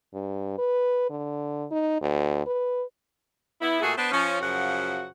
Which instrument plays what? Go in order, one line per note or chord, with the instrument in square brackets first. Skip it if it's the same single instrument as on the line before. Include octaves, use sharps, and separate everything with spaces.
[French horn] G2
B4
D3
D#4
D2
B4
[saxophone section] B3 E4
A#2 A3 F#4 G#4
B3 D4 B4 C5
F3 C#4
F#2 C#3 F3 F#4 F#5